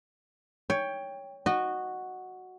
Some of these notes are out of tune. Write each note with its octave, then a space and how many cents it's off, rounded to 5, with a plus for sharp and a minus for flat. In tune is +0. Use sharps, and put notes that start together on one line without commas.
C#5 +10 G5 +15
F#4 +0 D#5 -25